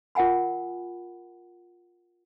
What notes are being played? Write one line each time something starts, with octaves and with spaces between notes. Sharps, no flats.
F4 A#4 F#5 G#5 B5